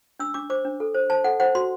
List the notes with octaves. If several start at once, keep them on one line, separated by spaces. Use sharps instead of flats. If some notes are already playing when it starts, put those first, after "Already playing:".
D4 E6
D4 D6
C5 D6
D4
A4
C5
C5 A5
A4 F#5
C5 F#5
F#4 C6